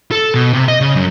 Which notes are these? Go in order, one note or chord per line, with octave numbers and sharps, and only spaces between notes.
A4
B2
C3
D#5
C#3
F#2